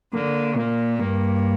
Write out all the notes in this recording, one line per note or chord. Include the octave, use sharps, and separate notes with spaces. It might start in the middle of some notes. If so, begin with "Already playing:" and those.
D3 A#3
A#2 A#3
G2 A#3